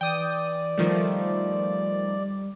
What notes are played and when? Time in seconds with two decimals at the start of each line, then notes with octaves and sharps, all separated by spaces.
0.01 E3 D5 G5 D#6
0.78 D#3 F3 G3 A3